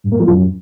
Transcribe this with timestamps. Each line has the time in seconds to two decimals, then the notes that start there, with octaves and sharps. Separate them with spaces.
0.04 G2
0.12 A#3
0.20 F3
0.28 F#2